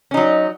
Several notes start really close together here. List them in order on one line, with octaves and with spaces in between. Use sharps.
C#4 D#4 F#3